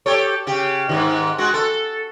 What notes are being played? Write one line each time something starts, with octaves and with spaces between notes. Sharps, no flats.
G4 A4 C#5
C#3 G4
G#2 D#3
G#3 F#4
A4